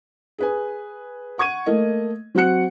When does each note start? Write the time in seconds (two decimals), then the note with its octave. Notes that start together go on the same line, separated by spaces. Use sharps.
0.38 G#4 B4 G#5
1.38 F#5 C#6 G#6 D#7
1.66 A3 A#3 D#5
2.35 F#3 C4 F#4 F#5 F#6 C#7